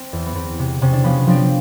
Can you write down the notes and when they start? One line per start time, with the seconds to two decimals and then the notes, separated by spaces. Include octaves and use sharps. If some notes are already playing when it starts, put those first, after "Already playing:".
Already playing: C4
0.13 E2
0.26 B3
0.35 E2 C4
0.59 C3
0.82 C3 C#4
0.93 D4
1.04 F3 B3 C#4
1.27 F3 C4 D4